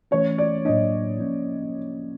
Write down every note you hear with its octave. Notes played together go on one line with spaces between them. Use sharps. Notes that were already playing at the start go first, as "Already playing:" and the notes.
E3 A3 C#4 C#5
D5
A2 F#3 A#3 D4 D#5
F3 A#3 C#4